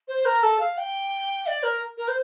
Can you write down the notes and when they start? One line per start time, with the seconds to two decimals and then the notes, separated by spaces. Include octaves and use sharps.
0.08 C5
0.25 A#4
0.43 A4
0.60 F5
0.78 G5
1.47 D5
1.63 A#4
1.98 A#4
2.08 C5